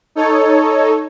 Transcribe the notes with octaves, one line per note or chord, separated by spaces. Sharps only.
D#4 A4 C#5